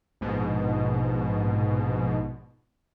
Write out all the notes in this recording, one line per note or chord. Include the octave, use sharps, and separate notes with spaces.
A#1 G#2 B2